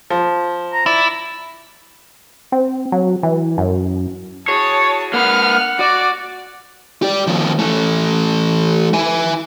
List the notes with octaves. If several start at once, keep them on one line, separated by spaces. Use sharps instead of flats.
F3
A#5
E4 D5
C4
F#3
E3
F#2
E4 F#4 G#4 C#5 A5
A#3 B4 F#5 F6
F#4 D5
G4 D5
D#2 F3
E3 A3
E4 G#5